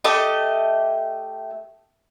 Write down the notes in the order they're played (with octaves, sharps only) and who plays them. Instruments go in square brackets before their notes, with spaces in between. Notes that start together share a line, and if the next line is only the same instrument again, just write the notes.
[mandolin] A3 G4 D#5